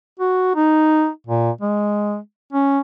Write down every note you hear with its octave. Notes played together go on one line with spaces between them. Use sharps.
F#4
D#4
A#2
G#3
C#4